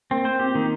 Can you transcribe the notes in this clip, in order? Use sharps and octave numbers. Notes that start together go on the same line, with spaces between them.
A#3 C4
A#3 C5
C4 G4
D#3 A#3